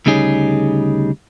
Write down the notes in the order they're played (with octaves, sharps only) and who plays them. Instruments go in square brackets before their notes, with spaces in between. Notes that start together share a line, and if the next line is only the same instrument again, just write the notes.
[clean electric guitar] D2 C#3 G3 D#4 G#4 C#5